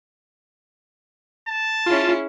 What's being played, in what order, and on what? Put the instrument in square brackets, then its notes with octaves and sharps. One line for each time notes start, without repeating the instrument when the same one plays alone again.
[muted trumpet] A5
[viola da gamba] C#4 E4 G#4 [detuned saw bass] F4